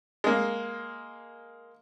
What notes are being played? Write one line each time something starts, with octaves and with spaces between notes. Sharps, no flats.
G#3 A#3